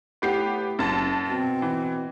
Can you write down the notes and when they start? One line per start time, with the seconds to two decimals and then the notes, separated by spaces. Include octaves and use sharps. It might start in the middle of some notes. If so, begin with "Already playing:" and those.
0.22 A2 B3 G4 C7
0.79 F#1 F#2 A5
1.30 B2 C4
1.62 E3